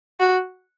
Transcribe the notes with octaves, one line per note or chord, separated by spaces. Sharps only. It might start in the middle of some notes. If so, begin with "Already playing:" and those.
F#4